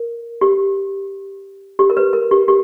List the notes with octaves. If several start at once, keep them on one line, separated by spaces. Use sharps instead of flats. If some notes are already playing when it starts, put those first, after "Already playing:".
Already playing: A#4
G4
G4
A#4
B4
A#4
G4
G4